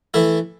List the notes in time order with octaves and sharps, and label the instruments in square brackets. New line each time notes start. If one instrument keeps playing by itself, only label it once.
[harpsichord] E3 A3 E4